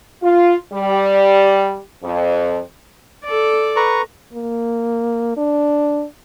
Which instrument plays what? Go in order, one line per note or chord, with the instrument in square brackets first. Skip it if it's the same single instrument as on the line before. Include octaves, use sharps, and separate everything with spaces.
[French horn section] F4
G3
F2
[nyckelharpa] A4 D5
[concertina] B4 A#5 C#6
[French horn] A#3
D4